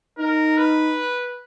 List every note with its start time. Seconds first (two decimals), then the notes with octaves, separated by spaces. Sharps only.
0.18 D#4 A#4
0.57 B4